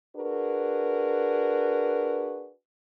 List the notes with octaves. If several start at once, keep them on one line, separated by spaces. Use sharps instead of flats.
D4 F#4 G#4 A#4 B4